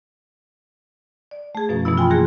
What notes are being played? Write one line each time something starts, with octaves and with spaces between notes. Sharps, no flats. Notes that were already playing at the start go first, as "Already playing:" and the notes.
D5
A3 G#4
F#2 B2 F3 C#4
B2 E3 F#3 B3 E4
F4 G5 G#5 B5 C6
C3 E3 A#3 G#4 F#6 A#6